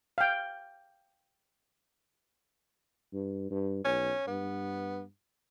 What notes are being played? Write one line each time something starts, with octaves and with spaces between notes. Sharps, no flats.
F5 G5
G2
G2
B1 C#4
G2 B3